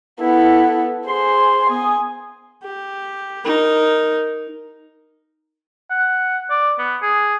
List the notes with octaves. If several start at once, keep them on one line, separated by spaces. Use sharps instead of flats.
B3 E4 A4
G#4 C5 C6
B3 G#5 D#6
G4
D#4 A#4
F#5
D5
B3
G#4